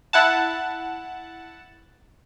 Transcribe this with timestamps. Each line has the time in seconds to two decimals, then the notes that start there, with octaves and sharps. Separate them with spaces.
0.13 E4 F#5 A5